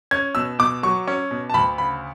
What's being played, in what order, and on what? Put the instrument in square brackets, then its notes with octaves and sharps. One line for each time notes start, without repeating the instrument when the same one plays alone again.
[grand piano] C#4 G#6
B2 E6
B2 D6
F#3 C#6
C#4
B2
A5
D2 B5
C#3 B5